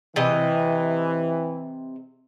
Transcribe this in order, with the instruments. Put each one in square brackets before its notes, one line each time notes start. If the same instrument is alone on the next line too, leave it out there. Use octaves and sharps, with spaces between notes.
[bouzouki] C3 D#5 [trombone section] E3